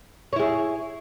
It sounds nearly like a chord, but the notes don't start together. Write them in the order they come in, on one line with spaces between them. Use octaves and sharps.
C#5 E4 G#4